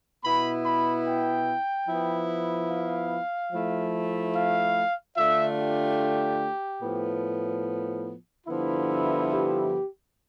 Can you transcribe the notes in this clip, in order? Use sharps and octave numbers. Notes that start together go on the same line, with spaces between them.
B2 B3 E4 B5
B5
G5
F3 B3 E4
F5
F3 A3 E4
F5
D3 A3 D4 F4 E5
G4
A2 F3 B3
G2 D3 F3 B3 E4
G4